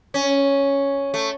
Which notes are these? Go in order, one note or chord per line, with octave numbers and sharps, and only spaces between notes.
C#4
A3